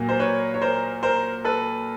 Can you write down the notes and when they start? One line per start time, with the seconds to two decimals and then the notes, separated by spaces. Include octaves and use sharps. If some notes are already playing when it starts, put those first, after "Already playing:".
Already playing: A#2 F#3 A#3
0.09 C5
0.19 B4 C#5
0.54 C#5
0.62 A#4 C5
1.03 A#4 C5
1.45 A4 B4